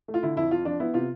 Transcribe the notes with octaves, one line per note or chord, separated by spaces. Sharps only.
A3
F4
D3 E4
F2 E4
F2 F4
F3 D4
B3 E4
C3 F4